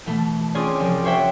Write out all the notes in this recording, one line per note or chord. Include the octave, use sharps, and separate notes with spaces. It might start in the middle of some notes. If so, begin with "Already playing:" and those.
B2 E3 A3
C4 C#4 F4 G#4 C#5 D5
C2 F3 D5
F#4 C5 C#5 E5 G5